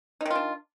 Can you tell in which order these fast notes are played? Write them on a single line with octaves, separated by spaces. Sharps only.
D#4 D#3 F4 D4